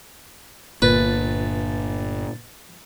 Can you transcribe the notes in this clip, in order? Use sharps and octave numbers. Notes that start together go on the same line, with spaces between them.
G1 A#2 B4 A6